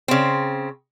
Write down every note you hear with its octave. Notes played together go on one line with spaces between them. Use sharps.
C#3 C4